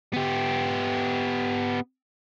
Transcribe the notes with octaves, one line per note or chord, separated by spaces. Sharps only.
B3 G4